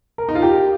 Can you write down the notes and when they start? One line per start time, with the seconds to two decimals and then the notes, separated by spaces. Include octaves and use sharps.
0.18 A#4
0.29 D#4
0.35 F4
0.42 G4